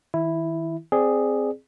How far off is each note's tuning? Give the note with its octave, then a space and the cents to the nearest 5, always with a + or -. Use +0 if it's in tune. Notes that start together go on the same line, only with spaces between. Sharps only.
D#3 +40 E4 +0
C4 +0 G#4 +0 D5 +15